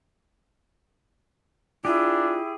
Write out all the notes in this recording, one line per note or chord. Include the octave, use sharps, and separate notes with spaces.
D4 E4 F4 G4 G#4